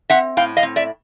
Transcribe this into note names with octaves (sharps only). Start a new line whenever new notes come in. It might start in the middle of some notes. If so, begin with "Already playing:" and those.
C4 E5 F#5
A2 F5 G5
D#5 F5
C4
D5 E5